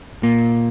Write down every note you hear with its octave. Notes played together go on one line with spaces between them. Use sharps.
A#2 A#3